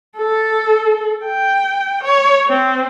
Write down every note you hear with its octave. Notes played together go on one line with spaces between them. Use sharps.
A4
G5
C#5
C4